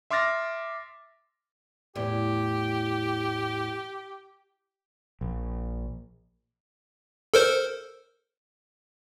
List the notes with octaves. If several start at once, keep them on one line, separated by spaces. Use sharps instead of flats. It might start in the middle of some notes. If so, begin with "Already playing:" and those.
E5 C6 D6 F6 A6 A#6
E2 A2 G4
A#1
A4 A#4 C5